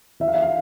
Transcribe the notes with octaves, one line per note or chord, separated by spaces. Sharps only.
E3 E5
F5
E5
F5